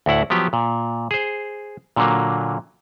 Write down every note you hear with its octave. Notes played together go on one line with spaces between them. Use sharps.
D2 A2 E4 F#5
F3 F#3 B3 G4
A#2
G#4 C5
A#2 D3 F#3 A#3